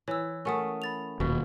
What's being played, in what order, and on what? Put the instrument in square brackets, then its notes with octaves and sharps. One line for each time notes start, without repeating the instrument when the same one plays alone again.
[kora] E3 [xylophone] C#5 E6
[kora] A3 C#4 [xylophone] A#4 F#5 D#6
[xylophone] B5 A6 F7
[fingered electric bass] D#1 [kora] B2